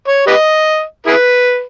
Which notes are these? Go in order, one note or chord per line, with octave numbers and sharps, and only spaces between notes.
C#5
G4 B4 D#5
E4 G#4 B4